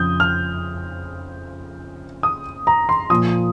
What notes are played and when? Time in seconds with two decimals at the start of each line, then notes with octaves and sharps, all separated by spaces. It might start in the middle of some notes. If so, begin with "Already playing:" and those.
Already playing: F2 C#3 F3 D#6 G6
0.20 F6
2.23 D#6
2.67 A#5
2.89 C6
3.10 A#2 F3 D#6